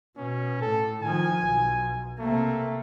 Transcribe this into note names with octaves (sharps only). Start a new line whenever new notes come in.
B2 C#4
A2 A4
D#3 F3 G#5
B1
C3 A3 A#3